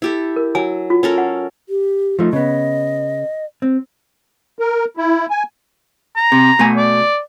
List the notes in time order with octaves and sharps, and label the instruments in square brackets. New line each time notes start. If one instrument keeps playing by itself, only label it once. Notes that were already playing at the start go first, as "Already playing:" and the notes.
[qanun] E4 G4 A4
[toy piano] A#4
[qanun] F#3 [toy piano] G#5
[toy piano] F4
[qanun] C#4 A4 A#4
[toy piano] F#5
[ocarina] G4
[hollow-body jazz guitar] F3 A3 D#4
[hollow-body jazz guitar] C#3 B3 [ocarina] D#5
[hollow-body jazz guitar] C4
[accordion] A#4
E4
G#5
[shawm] A#5
[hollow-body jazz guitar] C3
B2 A3 G#5
[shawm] D5